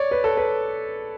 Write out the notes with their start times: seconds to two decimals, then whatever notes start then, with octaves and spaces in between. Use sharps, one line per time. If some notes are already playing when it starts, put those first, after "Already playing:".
Already playing: C#5 D5
0.11 B4
0.24 A4
0.37 B4